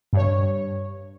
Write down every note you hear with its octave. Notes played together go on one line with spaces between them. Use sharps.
G2 C#5